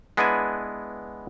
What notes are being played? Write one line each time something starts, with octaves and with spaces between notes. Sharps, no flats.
G#3 B3 D4 E4 B4 G#5